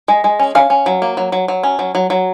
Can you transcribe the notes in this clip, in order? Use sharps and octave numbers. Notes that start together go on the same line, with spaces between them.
G#3
G#3
C#4
C#4 F5
C#4
F#3
A#3
F#3
F#3
F#3
C#4
F#3
F#3
F#3